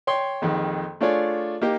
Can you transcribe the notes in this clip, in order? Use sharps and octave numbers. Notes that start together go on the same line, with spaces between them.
C#5 G5 C6
A#1 F2 D#3
A3 D4 F4 G#4 C#5 D5
A#3 D#4 G4